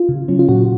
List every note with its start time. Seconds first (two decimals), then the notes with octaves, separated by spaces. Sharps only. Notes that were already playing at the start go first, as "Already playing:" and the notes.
Already playing: F4
0.09 C#3
0.28 F#3 C#4
0.39 F4
0.49 A#2 F#4